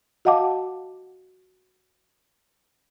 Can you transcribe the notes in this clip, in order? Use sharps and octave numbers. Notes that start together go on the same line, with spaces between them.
F#4 D#5 F5 F#5 A5 D6